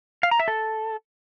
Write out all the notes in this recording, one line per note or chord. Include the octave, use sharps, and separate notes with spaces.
F5
A#5
E5
A4